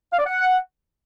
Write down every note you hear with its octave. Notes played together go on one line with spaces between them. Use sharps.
F5
D5
F#5